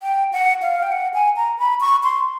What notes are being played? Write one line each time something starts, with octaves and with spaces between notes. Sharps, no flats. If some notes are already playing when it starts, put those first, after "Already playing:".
G5
F#5
F5
G5
F#5
G#5
A#5
B5
C#6
C6